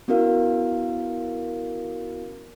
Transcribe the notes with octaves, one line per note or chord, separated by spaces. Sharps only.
B3 C#4 E4 F#4 A#4 F5